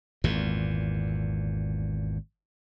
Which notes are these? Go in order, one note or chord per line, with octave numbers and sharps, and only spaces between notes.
G#1 E2 A#2